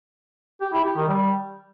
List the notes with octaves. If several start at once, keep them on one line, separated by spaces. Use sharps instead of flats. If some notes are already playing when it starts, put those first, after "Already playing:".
G4
E4
G4
D#3
G3